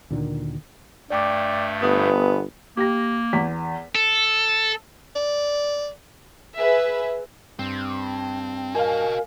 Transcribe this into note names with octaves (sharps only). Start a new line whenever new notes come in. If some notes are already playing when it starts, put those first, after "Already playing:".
D2 A#2 D3 D#3
G2 A3 D5 G5 D6
G1 B3 D#6
A#3 G4 A#6
E2 B6
A4
D5
G#4 B4 E5
G2 C4
F#4 A#4 D#5 F5 G#5